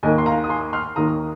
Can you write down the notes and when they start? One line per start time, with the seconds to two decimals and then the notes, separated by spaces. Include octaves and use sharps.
0.03 D#2 D#3 A#3 D#5 G#5
0.18 C6
0.26 F5 A#5
0.44 D#6
0.49 G#5 C6
0.73 C6 F6
0.96 D#2 D#3 A#3 A#5 D#6